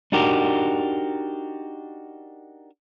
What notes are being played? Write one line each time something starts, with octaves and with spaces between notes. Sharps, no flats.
D4 D#4 F#4 G4 A#4